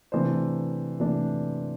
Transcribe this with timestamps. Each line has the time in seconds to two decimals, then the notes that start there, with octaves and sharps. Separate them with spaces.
0.12 C3 E3 A3 D4 C5
1.00 C3 E3 A3 D4